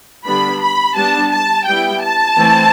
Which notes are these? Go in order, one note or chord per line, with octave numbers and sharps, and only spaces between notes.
D3 G3 B3 D4 B5
B5
G3 B3 D4 A5
A5
G3 B3 E4 G5
A5
E3 A3 C4 E4